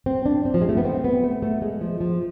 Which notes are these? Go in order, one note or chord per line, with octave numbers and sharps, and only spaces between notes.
C4
D4
C4
F3
G#3
A3
B3
C4
B3
A3
A3
G#3
F3
F3